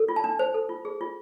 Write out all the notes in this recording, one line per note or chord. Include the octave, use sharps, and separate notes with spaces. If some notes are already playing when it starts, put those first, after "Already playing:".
Already playing: A4
F4
A5
D4
C5
A4
F4
G#4
F4